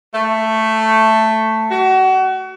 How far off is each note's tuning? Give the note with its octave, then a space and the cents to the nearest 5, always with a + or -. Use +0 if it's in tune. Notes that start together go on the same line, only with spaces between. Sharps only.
A3 +5
F#4 +30